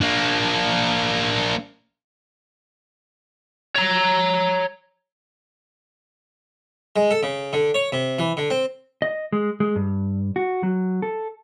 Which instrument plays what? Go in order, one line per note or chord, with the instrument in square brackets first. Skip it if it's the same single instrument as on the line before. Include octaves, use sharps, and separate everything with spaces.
[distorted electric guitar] A#3 D4
[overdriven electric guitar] C#5 A#5
[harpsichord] G#3
A4
C#3
D3
C#5
C3
E3
D3
C4
[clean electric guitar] D#5
G#3
G#3
G2
F#4
F#3
A4